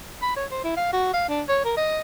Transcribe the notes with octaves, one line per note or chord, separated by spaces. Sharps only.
B5
C#5
C5
E4
F5
F#4
F5
D4
C#5
A#4
D#5